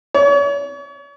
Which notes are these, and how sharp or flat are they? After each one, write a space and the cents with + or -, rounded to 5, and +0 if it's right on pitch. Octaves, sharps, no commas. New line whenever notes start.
C#5 +40